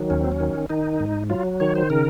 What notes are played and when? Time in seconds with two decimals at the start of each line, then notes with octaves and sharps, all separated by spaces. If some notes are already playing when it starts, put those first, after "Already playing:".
Already playing: D#3 F#3
0.10 D#2 C#4
0.21 C4
0.32 C#4
0.40 D#3
0.70 D#3 D#4
1.00 G#2
1.30 F#3 F4
1.60 D#3 C#5
1.75 C5
1.90 C#3 A#4